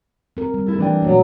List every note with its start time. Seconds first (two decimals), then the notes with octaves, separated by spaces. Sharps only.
0.37 C4 A#4
0.54 G3
0.66 E4 A4
0.78 E3 D4 G5
1.02 A#2 F#3 A3 A#3